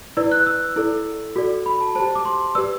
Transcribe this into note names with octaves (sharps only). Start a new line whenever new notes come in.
E4 B4 D5 E6
F#6
E6
E4 A4 D5
F#4 A4 D5
B5
A5
G4 C5 A5
D6
C6
G4 B4 D5 E6